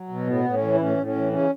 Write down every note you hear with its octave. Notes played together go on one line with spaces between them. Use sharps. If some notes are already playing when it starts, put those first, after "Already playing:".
Already playing: F#3
B2
A2 B3
A2
C#4
E3
E4
A2 C#4
A2
C#4
E3
C#3 C#4